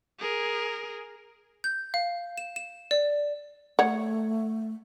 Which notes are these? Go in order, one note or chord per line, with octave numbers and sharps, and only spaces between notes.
G#4 A#4
G6
F5
E7
E7
D5
A3 C#5 F#5